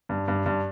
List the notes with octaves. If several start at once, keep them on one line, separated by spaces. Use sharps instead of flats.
G2
G2
G2